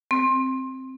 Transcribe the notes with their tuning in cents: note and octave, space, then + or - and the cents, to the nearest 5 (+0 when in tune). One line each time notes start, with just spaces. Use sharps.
C4 +0 C6 +20